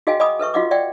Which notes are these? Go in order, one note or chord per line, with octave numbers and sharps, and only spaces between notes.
F#4 G#4 D#5 F5 G5 G#5
D#5 F#5 G#5 B5 D6 D#6
A4 B4 E5 C#6
F4 F#4 D#5 F5 F#5 D6
D5 E5 F#5 G5